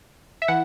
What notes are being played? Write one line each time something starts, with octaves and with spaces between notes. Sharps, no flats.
E5
E3 F#5